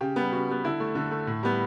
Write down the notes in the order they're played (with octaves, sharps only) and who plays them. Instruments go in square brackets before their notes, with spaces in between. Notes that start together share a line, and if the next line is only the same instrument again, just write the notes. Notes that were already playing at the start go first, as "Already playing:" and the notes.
[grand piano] C#3 G4
G3 B3
C#3 F#4
G3 B3
D3 E4
A3
D3
A3
A2
G3 B3